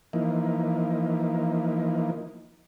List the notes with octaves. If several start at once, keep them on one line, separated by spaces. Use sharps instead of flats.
E3 F3 A#3 D#4